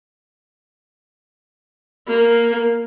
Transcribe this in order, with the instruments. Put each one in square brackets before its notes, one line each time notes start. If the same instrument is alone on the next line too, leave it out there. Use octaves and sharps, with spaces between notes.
[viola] A#3